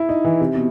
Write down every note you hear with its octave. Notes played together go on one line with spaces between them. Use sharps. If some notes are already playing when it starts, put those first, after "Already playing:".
Already playing: E4
D#4
E3
C3
B2